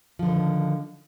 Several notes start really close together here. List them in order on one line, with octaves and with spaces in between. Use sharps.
F3 D3 D#3